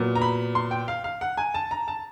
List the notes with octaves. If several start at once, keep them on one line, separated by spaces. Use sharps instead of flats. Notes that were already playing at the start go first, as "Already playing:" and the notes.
Already playing: A#2 F#3 B3
A#5
B5
C6
G5
F5
F5
F#5
G#5
A5
A#5
A5